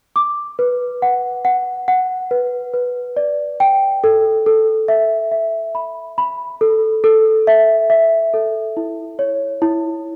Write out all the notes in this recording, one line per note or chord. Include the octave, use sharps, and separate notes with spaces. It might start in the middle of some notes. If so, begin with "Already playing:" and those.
D6
B4
F#5
F#5
F#5
B4
B4
D5
G5
A4
A4
E5
E5
B5
B5
A4
A4
E5
E5
A4
E4
C#5
E4